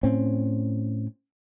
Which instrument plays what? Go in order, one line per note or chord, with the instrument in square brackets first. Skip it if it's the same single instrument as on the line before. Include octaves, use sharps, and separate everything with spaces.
[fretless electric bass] A2 C4 C#4